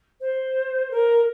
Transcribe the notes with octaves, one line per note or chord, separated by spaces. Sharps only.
C5
A#4